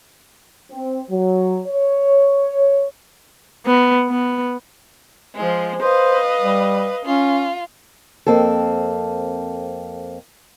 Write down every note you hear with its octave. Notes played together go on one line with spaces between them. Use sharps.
C4
F#3
C#5
B3
B3
F3 G#3
B4 C5 D#5 F5
G3
C#4 F4
F2 A#3 C4 A4